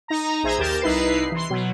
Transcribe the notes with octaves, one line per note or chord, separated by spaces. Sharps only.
D#4 A#5
A#1 G#4 C5 E5 A#5 G#6
D#2 G4 A#4 G6 A6 E7
C2 D#4 E4 B4 C7
E3 C6
B2 F#3